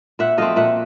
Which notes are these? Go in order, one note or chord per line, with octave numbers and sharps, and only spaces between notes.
A#2 E5 F#5
F3 A3 C4 D#5 F5
A#2 E5 F#5